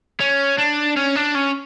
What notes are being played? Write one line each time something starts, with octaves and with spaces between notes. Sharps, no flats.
C#4
D4
C#4
D4
C#4